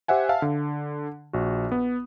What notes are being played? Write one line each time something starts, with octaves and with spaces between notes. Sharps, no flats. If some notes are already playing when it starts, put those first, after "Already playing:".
G4 C5 E5 F#5 G#5
E5 F5 A5
D3
A#1 F#4
B3